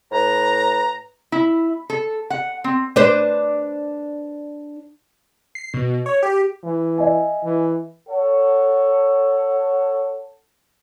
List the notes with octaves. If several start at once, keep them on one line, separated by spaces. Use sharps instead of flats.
A2 B4 A#5
E4
A4
F#5
C4
D4 B4 C5
C7
B2
C#5
G4
E3
D#5 E5 G#5
E3
A4 C#5 F#5